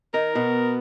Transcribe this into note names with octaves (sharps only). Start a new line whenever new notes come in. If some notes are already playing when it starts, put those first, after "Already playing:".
D#3 D#4 A#4
B2 B3